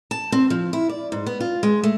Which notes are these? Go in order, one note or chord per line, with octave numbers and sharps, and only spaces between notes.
A5
C4
F3
E4
D5
G#2
B3
F4
G#3
A3